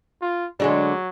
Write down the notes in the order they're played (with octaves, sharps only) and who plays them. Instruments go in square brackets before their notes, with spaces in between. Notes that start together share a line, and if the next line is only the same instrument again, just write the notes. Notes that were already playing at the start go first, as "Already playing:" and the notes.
[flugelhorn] F4
[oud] D3 G#3 D4 [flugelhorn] F#3